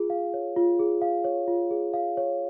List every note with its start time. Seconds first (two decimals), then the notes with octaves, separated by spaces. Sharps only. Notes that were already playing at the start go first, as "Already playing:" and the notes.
Already playing: F4 G#4
0.10 F5
0.34 C#5
0.56 F4
0.79 G#4
1.02 F5
1.24 C#5
1.48 F4
1.71 G#4
1.94 F5
2.17 C#5